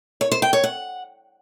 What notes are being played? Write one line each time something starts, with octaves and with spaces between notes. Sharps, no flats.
C#5
C5
G5
C#5
F#5